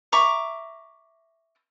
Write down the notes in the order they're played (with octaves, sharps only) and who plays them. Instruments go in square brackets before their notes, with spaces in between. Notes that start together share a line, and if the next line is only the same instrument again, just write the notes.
[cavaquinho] E5 A#5 C#6 D6